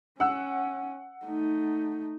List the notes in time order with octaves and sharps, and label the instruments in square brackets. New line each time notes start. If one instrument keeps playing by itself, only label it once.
[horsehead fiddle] C#4 [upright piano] F#5 E6
[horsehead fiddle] A3 D#4